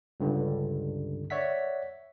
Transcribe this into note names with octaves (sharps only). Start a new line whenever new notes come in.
C#2 G2 D3
C#5 D5 E5 F#5 B6